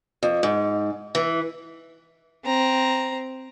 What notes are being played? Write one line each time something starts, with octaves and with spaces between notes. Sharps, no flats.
F2
G#2
E3
C4 A#5